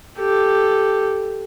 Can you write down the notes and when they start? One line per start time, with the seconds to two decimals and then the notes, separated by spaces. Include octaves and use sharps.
0.19 G4 A4